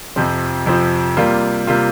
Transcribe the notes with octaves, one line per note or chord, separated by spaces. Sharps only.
F2 C3 F3 C4
F2 C3 F3 C4
C3 G3 A#3 F4
C3 G3 A#3 F4